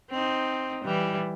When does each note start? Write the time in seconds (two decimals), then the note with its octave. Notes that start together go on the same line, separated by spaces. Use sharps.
0.11 C4 D#4
0.84 E3 G3